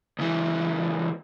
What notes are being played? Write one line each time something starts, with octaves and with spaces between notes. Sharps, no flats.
C#2 E3